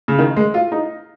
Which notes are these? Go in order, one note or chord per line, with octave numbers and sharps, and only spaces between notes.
C#3
D#3
G#3
F4
D#4